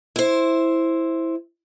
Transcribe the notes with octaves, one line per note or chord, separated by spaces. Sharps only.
E4 C5